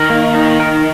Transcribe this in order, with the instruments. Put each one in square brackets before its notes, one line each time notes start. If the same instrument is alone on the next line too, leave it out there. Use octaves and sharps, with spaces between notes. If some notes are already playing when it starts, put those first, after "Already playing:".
Already playing: [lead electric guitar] D#3 [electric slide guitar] A#4
[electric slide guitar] A#3
D#4
A#4